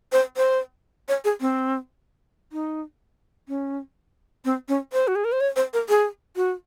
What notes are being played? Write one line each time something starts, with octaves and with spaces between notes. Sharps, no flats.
C5
C5
C#5
G#4
C4
D#4
C#4
C4
C#4
C5
F#4
G#4
A#4
C5
C#5
C5
A#4
G#4
F#4